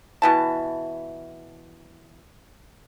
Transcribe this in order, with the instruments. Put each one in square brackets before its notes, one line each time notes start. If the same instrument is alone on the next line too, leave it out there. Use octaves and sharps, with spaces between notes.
[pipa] B2 E3 A5